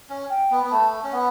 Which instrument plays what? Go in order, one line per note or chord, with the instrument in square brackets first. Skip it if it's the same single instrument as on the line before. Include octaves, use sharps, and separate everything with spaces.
[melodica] C#4
[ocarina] G5
[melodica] B3
B3
[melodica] A3 [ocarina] A5
[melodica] C#4
[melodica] B3 [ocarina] F#5